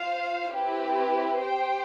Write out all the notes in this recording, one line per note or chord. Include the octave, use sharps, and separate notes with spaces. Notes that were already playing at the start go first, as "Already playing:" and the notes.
Already playing: F4 C5 F5
C4 E4 G4 B4
G4 C5 G5